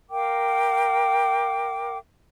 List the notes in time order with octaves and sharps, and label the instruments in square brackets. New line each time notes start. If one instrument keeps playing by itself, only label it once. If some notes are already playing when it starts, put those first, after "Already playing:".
[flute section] A#4 F5 G5 D6